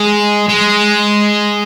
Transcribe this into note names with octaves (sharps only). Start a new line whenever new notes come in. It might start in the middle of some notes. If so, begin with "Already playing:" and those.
Already playing: G#3
G#3